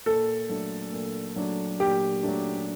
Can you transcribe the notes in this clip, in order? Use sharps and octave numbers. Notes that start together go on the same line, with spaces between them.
A#2 A4
F#3 A3 D4
A#2
F#3 A3 D4
A#2 G4
F#3 A3 D4